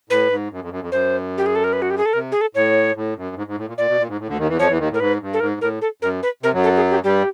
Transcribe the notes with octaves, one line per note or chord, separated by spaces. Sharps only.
A2 B4
G#2
F#2
F2
F#2
F2
F#2 C5
G4
G#4
A4
A#4
B4
F#4
G4
G#4
A4
C3 A#4
G#4
A4
A2 C#5
A2
F#2
G#2
G#2
A2
A#2
A#2 D5
B2
A#2
G#2
A2
D2 D3
D#2 D#3
E2 E3
F2 F3 C#5
E2 E3
D#2 D#3
A2 A#4
G#2 B4
G2
A4
G#2 A#4
A2 A#4
A4
F#2 A#4
B4
C3 A#4
F#2 F#3
A4
G#4
G4
G2 G3 G4